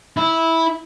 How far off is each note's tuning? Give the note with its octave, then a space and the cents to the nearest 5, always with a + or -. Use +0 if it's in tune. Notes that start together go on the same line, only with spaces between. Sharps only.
E4 -10